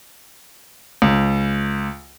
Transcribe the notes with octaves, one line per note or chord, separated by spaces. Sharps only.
C#2